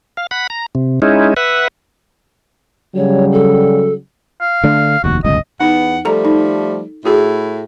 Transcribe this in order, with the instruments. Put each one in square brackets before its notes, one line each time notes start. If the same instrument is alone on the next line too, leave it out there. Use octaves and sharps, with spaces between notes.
[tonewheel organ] F5
F#5 B5
A#5
C3
G#3 C#4 D#4 E4
B4 E5 F#5
[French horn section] C#3 F#3 G3 [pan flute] C#5
[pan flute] A4
[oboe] F5
[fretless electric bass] D3 A3 D4
[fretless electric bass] F1 D#2 [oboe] F#4
[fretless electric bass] D1 G1 C#2 [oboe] D#5
[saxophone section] E2 B3 F#5 [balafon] D#4
[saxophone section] F3 G3 A3 [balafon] A4 A#5
[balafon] D#4
[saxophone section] A2 E4 [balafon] F#4 G#4